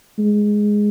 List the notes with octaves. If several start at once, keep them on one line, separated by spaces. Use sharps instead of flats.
G#3